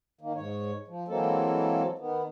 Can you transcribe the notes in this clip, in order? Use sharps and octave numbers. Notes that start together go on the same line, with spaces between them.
D#3 A#3
G#2 C#5
F3
E3 F#3 G#3 A#3 C4 A4
D#3 B3